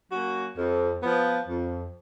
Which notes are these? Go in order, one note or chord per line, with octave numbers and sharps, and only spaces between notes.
F#3 A#3 C#4 F#4
F2
F3 B3
F2